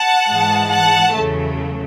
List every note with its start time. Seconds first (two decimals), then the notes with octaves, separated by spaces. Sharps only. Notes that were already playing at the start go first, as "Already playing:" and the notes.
Already playing: F#5 A5
0.27 G#2 E3 G#3
0.70 F#5 A5
1.14 E2 C#3 F#3 A3